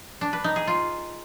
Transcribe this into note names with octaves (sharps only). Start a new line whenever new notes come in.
D4
B4
D#4
G#4
F4